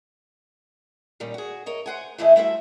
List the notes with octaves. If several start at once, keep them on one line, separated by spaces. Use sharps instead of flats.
A#2 D#3 G3 C#4
F#4 G#4
A#4 C#5 D#5
C5 F#5 G#5
A2 E3 A3 E4 G#4 D#5
G3 A3 E4 F#4 C5 E5